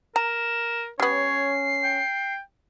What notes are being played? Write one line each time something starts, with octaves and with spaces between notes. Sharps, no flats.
A#4 A#5 E7
G3 B3 C#4 C#5 C7
G5